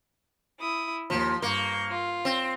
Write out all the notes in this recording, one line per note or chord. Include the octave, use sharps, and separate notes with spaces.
E4 D#6
D#2 F3
G2 A#3 C#6 G6
F4
C4